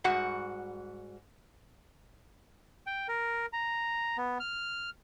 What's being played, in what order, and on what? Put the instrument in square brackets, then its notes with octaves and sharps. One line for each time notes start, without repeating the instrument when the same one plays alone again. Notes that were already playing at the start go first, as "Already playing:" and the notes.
[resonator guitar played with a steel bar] G#2 G3 F#4 F#5
[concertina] G5
A#4
A#5
B3
F6